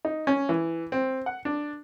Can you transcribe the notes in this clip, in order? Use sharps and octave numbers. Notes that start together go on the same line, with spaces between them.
D#4
C#4
E3
C4
F#5
D4